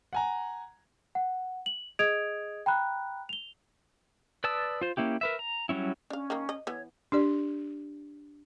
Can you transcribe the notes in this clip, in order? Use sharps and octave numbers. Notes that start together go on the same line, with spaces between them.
F#5 G#5 A#5
F#5
F#7
G#4 D#5 D#6 G#6 D7 F7
G5 A#5 B5 F#6
F7 G7
B4 D5 A5 D#6 E6
F4 C5
A#3 C#4 E4 G4
A#4 B4 E5
A#5
F#3 G3 C#4 E4
C#4 D4 F5
D#3 A#3
D#5
E3 B3 C#5
D4 G4 D5